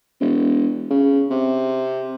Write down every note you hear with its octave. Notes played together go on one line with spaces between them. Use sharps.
E1
C#3
C3